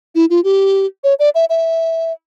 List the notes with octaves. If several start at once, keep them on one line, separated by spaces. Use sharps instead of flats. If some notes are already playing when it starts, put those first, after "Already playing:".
E4
F4
G4
C#5
D5
E5
E5